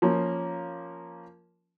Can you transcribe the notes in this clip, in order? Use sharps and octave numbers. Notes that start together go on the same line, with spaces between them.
F3 A#3 C#4